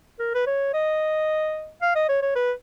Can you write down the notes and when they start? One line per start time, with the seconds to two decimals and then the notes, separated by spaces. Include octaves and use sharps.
0.19 A#4
0.34 B4
0.47 C#5
0.74 D#5
1.82 F5
1.95 D#5
2.09 C#5
2.22 C#5
2.36 B4